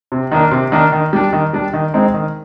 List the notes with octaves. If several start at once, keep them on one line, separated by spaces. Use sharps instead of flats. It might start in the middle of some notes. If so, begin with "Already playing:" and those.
C3
D#3 A#3 D4
C3
D#3 A#3 D4
D#3
G3 D4
D#3
G3 D4
D#3
G#3 C4 D#4
D#3